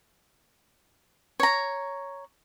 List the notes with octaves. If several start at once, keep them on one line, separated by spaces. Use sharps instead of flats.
C#5 A#5